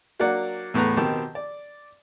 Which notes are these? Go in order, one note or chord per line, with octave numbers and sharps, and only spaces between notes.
F#3 A#3 D4 D5 F#5
E2 A2 B3 B4 A#5
B2 D#3 C4 G4 A5
D5